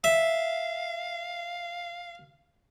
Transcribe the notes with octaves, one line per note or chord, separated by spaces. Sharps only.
E5 F5